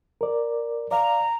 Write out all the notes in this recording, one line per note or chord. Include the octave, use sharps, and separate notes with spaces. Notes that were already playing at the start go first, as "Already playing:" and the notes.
A#4 D5
D5 F5 A#5